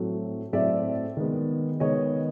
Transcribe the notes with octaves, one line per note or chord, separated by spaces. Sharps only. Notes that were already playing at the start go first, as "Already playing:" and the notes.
Already playing: A2 F#3 A3 C4
A2 F#3 A3 C4 D5 E5
D#3 G#3 B3
D#3 G#3 B3 C#5 D#5